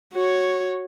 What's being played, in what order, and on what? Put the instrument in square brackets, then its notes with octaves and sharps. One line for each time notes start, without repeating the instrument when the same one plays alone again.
[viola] F#4 C#5